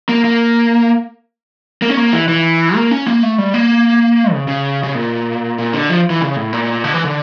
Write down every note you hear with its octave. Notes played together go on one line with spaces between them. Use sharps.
A#3
A#3
A#3
C#4
A#3
E3
E3
A#3
C#4
A#3
A3
G3
A#3
C#3
C#3
C#3
A#2
A#2
D3
F3
E3
C#3
A2
A#2
D3
E3
D3